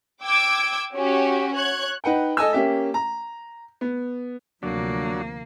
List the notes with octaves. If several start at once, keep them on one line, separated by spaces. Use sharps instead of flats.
G5 D6 E6 G#6 D7
C#4 F#4 G4
C#5 F#6 G#6
D#4 B4 F#5 G5
A4 D#5 G#5 E6
A#3 C#4 G4 E5
A#5
B3
D2 C3 F3 F#3 A#3 D4